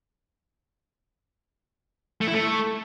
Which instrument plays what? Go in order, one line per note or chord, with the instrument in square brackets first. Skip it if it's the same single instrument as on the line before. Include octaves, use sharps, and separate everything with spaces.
[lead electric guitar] A3
E4
A3